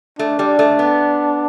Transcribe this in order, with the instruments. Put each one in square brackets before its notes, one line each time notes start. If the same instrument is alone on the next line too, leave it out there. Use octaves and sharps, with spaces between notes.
[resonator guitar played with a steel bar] A3 [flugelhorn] D4
[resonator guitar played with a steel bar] G3
A3
B3